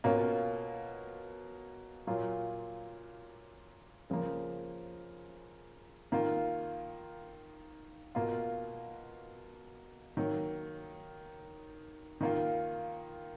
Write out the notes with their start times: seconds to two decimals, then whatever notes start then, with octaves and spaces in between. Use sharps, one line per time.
0.04 B2 A#3 C#4 F4
2.07 A#2 F#3 A#3 F4
4.10 C#3 F3 A#3
6.12 D#3 A#3 F4
8.15 B2 A#3 F4
10.17 D#3 F#3 A#3
12.21 D#3 A#3 F4